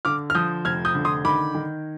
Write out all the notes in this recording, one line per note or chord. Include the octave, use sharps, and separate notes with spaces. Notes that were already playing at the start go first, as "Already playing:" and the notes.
D3 D6 F6
F6
F3 D#6 G6
F1 F6 G#6
D#6 G6
D3
C6 D#6
D#3 B5 D6
D#3